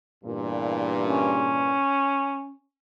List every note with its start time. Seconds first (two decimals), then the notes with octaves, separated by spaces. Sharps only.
0.24 E2 G2 A#2
1.08 C#4